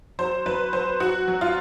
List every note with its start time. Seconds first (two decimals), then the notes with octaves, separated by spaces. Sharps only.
0.19 F#3 C5
0.46 F#3 B4
0.73 F#3 C5
1.00 F#3 F#4
1.28 F#3
1.41 F4